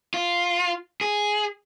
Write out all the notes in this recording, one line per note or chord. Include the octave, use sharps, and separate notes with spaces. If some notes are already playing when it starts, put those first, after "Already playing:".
F4
G#4